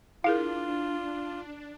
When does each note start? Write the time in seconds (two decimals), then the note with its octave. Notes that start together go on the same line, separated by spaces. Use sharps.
0.24 D4 E4 F4 G#4 A#4 F5